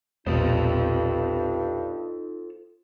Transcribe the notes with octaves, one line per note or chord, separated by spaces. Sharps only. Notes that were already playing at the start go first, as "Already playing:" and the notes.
E1 A#1 G2 B3 D#4 F4 A4 C5